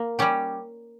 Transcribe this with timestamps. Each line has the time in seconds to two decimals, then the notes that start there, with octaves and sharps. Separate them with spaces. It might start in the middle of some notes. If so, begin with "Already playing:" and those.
Already playing: A#3
0.19 G3 C#4 G4